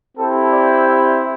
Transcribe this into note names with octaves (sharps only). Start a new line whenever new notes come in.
C4 E4 G4 A4
D5
E5